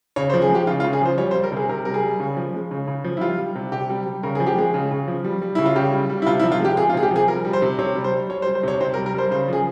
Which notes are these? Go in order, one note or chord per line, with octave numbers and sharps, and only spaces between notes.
C#3 C#5
C5
F3
G#4
G#3 G4
C#3 F4
F4
C#3
G#4
F3 C5
G3 C#5
C5
G3
A#4
C3 G#4
C3 A#4
G3 A#4
G#4
G3
C#3
F3
G#3
C#3
C#3
F3
E4
G3 F4
G3
C3
C3 G4
G3
G3
C#3 A#4
F3 G#4
G4
G#3 G#4
C#3
C#3
F3
G3
G3
C#3 E4
F4
C#3 G4
G3
G3
E4
C3 F4
E4
F3
F4
G#3 G4
C3 G#4
F4
C3 G#4
G4
F3 G#4
G3 A#4
G3
C5
C3
C3 C#5
G3
C5
G3
G3 C#5
C5
G3
C5
C3 C#5
C3 C5
A#4
G3
A#4
G3 C5
C#3 C5
F3 G#4